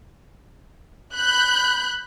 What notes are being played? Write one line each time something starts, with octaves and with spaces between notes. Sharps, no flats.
B5 F#6 G6